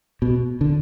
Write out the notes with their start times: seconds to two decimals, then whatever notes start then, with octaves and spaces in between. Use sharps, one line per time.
0.22 B2
0.61 D3